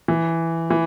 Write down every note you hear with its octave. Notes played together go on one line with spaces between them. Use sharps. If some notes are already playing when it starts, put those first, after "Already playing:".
E3
E3